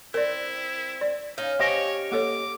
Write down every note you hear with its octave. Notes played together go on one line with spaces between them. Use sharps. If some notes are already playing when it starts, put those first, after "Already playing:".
C4 E4 A#4 D5
D5
C#4 D#4 F5
G4 C5 C#5 D#5 G#5
A#3 A4 C#5 D6